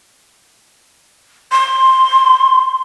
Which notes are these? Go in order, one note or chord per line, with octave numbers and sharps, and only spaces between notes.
C6